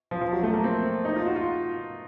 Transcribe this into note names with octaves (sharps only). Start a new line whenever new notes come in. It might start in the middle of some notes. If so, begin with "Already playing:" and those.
F3
F3
F#3
A3
A#3
C4
D#4
F4
F#4
F4